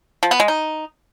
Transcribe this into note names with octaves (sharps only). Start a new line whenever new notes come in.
F3
B3
G#3
D#4